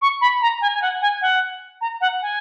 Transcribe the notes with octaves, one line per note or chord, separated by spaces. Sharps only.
C#6
B5
A#5
G#5
G#5
F#5
G#5
F#5
A#5
F#5
G#5